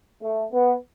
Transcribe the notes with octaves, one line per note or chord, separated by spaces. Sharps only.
A3
B3